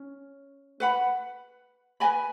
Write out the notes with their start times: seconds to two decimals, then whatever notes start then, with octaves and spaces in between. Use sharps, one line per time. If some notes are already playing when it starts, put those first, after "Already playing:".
Already playing: C#4
0.80 B4 F#5 B5
2.00 B4 D#5 G#5 B5